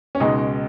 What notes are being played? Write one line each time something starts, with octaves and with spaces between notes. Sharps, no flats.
C#4
C#2 B2 G#3 D#4